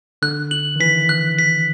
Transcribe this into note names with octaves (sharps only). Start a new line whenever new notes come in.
D3 F#6
F#7
D#3
E3 B6
F#6
B6